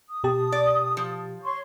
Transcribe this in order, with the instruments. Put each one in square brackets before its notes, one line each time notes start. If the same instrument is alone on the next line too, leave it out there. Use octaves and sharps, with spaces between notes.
[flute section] D#6
[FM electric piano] B2 G4 A5
[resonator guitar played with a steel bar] D5
F3
[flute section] C#5 C6 C#6